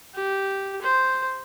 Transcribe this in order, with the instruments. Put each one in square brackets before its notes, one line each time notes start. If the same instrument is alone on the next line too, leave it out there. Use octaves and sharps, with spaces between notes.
[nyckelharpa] G4
C5